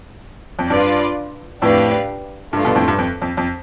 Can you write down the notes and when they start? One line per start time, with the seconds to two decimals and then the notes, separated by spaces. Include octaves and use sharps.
0.59 F2
0.70 G2 D4 F4 B4 D5
1.61 F2 A2 D4 G4 B4 D5 F5
2.53 G2 A3 D4 F4 A4
2.65 G2 B2
2.75 F2 A2
2.88 G2
2.98 F2
3.22 F2
3.37 F2